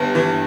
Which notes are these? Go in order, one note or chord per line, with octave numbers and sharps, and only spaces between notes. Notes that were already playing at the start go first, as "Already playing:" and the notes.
Already playing: G1 G2
E3